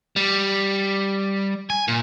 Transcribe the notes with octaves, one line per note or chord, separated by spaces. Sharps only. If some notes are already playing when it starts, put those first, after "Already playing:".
G3
G#5
A#2